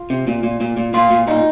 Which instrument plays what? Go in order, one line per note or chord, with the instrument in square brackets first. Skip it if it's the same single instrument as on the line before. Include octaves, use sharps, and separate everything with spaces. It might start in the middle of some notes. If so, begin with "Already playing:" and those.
Already playing: [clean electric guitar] F4
C3
A#2
A#2
A#2
A#2
A#2 F4
A#2
A#2 D#4